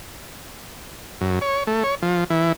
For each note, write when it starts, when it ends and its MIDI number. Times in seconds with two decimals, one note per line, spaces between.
1.21 1.39 42
1.41 1.63 73
1.67 1.83 57
1.84 1.95 73
2.02 2.24 53
2.30 2.52 52